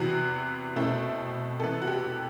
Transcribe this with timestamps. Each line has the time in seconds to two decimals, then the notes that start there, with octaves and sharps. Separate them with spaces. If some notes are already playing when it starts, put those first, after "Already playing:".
Already playing: E2 C3 E3 B3 F#4
0.76 B2 A3 C4 E4
1.60 C3 E3 B3 A4
1.82 F#4
1.87 G4